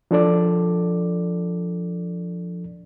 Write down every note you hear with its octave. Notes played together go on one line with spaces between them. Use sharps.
F3 D4 A4 D5